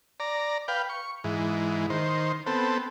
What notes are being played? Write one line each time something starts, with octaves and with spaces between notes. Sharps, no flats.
D5 A#5
B4 F5 G5
C#6
G#2 E3
D#3 C5
B3 C4 A4